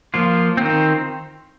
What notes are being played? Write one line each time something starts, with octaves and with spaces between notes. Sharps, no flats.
F3 A#3 F4
D#3 C4